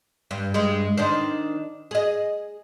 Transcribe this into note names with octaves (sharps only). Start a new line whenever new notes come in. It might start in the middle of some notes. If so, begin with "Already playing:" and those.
G2
G2 G#3
D#3 D4 C5
G#4 D#5